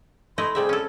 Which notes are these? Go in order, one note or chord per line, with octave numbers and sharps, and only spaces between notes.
A3 E4 D#5 C6
C3 G3 G#4 E5
C#4 A4